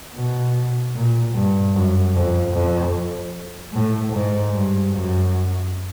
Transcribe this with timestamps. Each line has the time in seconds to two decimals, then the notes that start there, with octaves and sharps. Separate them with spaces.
0.15 B2
0.95 A#2
1.34 G2
1.74 F#2
2.14 F2
2.54 F2
3.73 A2
4.13 G#2
4.54 G2
4.93 F#2